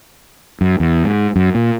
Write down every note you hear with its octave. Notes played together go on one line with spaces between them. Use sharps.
F#2
E2
G#2
F#2
A#2